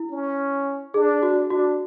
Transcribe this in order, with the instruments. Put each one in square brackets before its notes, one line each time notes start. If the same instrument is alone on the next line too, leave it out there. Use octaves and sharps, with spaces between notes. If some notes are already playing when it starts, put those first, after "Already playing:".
Already playing: [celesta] E4
[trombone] C#4
[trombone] D4 [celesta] G#4
[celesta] F#4
[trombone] D4 [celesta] F#4